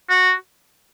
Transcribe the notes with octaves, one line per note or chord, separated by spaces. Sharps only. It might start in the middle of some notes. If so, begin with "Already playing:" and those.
F#4